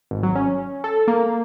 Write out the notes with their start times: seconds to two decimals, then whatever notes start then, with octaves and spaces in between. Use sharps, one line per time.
0.11 G#1
0.23 F#3
0.35 C#4
0.84 A4
1.08 A#3